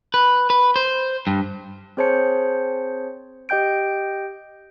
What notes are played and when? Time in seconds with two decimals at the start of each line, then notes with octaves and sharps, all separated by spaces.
0.14 B4
0.50 B4
0.76 C5
1.27 G2
1.97 C4 G#4 C5 C#5 A5 C#7
3.49 G4 D#5 G5 G6 D7